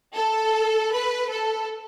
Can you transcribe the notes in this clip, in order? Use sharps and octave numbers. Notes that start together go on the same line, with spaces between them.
A4
B4
A4